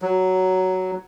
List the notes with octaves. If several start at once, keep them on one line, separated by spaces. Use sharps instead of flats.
F#3